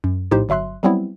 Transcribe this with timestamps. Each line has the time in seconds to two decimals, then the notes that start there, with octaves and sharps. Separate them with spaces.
0.04 F#2
0.31 A#1 A2 D#4 G4 C5
0.49 G1 F#3 E5 C6 F#6
0.83 F#3 G3 B3 C4 E4